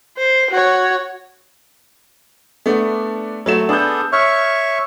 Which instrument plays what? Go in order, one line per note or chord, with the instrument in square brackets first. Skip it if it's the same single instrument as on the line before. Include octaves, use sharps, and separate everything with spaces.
[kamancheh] C5
F#4 C#5
[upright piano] A3 B3 D4
F#3 A3 E7
[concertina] B3 G#4 A4 [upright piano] D4 G6
[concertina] C#5 E5 C#6 [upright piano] F6